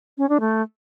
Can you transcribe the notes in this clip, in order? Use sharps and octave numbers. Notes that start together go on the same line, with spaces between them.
C#4
D4
A3